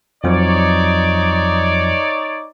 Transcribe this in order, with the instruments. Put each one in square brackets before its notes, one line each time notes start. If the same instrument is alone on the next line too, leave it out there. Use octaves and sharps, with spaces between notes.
[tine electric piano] F2 F3 F#3 [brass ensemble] D#4 C#5 D5